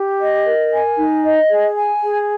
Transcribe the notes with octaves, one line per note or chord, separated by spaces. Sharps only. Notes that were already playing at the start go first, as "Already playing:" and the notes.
Already playing: G4
D#5
A#4
G#5
D#4
D#5
G#4
G#5
G#4